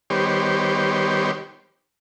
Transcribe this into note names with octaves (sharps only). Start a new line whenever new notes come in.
D#3 G3 B3 G4 C5 C#5